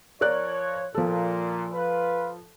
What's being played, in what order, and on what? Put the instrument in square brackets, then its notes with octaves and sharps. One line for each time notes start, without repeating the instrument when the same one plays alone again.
[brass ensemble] F3 C#5 [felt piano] A#4 D5 F#6
[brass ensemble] A#2 [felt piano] F3 A4
[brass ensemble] F4 B4